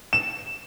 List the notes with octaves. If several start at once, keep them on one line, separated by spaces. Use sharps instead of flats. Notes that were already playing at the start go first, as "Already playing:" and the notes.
E7